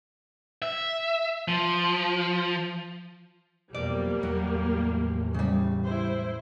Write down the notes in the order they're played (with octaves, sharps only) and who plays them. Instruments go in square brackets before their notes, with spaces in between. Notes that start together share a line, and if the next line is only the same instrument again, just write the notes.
[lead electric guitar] E5
F3
[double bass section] F2 B2 F#3 [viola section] G3 A#3 [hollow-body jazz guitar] D5
[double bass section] E2 A2 [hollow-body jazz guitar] F#3
[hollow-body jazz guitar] C#3 G3
[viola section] E4 C5